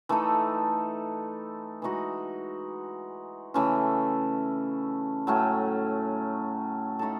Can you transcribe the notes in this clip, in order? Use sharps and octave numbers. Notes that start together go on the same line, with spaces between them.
E3 A3 D#4 A4
E3 G#3 D#4 F#4
C#3 E3 A3 C#4
A2 F#3 A3 C#4
A3 D#4 A4